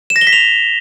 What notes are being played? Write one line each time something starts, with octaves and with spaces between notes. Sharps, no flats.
E7
A#6
G7
B6
F7